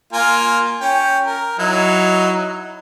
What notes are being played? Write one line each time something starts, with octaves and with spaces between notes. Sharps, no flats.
A#3 F4 G#5
C#4 G5
A#4
F#3 D#4 E4